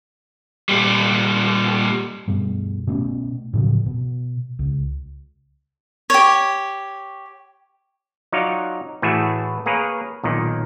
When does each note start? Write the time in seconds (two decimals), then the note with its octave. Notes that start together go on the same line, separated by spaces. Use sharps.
0.69 A#2 G3
2.28 G2 B2 G3
2.87 B2 A3 B3 C#4
3.53 A2 C#3 F3 F#3
3.86 B2
4.59 C#2
6.10 G4 C#5
8.32 F#3 D#4 F4 C#5 D5 F5
9.02 A2 E3 A3 F#4 G#4 E5
9.66 A#3 G#4 A#4 B4 C#5
10.23 B1 A#2 D#3